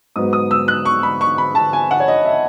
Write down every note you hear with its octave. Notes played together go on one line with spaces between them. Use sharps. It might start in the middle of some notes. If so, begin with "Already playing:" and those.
G#2 F#3 B3 D#6
D#6
E6
F#6
C#6
B5
C#6
B5
A5
G#5
F#5
C#5
D#5
E5